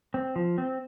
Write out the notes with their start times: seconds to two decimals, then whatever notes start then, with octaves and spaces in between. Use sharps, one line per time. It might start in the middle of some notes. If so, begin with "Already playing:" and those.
0.14 C4
0.36 F3
0.58 C4